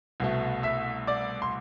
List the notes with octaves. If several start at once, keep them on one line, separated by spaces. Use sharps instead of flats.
C2 B2 A3
E5 E6
D5 D6
C6